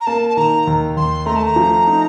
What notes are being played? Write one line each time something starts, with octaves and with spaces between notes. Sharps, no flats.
A#5
A#3 A5
A5
D#3 A#5
D#2
D#2 C6
A3 A#5
A5
A#5
F3
D#4